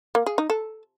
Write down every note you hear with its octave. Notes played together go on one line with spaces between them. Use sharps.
A#3
G#4
D#4
A4